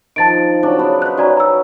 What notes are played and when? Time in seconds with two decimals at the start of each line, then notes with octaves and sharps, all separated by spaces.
0.16 D#3 F3 A5 A6 D7
0.63 C#3 F#3 D4
0.79 B3 C5
1.02 D#4 B4 F#6
1.18 C#4 F#4 D5 A#5
1.37 A#5 E6